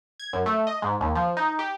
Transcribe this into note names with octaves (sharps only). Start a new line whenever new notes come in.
G#6
F#2
A3
D#5
G#2
D#2
F3
D#4
G4